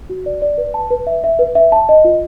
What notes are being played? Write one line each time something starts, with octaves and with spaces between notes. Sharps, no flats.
F#4
D5
D5
B4
A5
B4
E5
E5
B4
E5
A5
D#5
F4